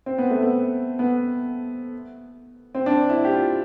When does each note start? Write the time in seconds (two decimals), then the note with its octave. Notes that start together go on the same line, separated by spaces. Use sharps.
0.06 C4
0.18 B3
0.30 A3
0.42 B3
0.99 B3
2.75 C4
2.86 D4
3.10 E4
3.25 G4
3.33 F4